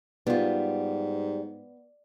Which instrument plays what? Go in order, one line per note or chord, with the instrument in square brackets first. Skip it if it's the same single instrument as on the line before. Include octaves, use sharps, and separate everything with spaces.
[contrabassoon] G#2 [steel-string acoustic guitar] G3 [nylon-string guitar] B3 F4